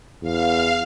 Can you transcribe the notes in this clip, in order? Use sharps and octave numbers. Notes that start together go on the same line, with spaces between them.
E2 F5